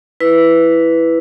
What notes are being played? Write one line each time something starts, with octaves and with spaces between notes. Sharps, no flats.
E4 B4